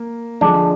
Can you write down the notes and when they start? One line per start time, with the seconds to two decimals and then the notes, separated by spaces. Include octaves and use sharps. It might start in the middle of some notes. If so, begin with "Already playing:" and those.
Already playing: A#3
0.41 D3 F3 G#3 D4